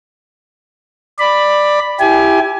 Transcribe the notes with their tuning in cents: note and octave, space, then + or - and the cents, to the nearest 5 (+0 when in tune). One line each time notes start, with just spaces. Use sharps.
D5 +10 B5 +0
E4 +0 G4 +0 G#5 +25